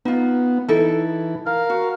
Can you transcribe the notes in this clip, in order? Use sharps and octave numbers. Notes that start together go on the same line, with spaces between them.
B3 D#4 F4
E3 D#4 E4 A4
A#4 F5
F#4